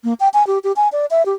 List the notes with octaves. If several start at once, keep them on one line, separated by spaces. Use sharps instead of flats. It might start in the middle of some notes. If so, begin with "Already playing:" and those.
A#3
G5
G#5
G4
G4
G#5
D5
E5
G4